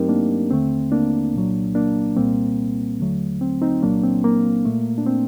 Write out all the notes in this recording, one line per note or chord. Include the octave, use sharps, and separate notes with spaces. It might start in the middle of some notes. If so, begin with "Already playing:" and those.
Already playing: G2 F#3 A3 C4 D#4 G4 A#4
A#3 D4
D#2 D3 A3 C4
A#3 D4
C2 A#2 F#3
A#3 D4
C2 A#2 G3 A#3 C4
D#2 D3 F#3 A3
C4
C4 D#4
C2 A#2 F#3 A#3 D4
C4
A#3
A#2 A3
D4
C4